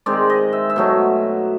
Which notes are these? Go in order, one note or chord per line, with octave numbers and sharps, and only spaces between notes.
D#3 G#3 C4 D5
D#5
E5
E5
B2 F#3 A3